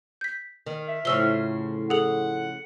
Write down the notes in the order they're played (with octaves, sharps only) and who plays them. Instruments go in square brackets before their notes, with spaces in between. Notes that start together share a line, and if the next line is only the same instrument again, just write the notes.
[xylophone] G6 B6
[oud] D#3
[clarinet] E5
[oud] A2 C#3 F3 [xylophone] E6 G7
[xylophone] G#4 A4 F#7 [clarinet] F#5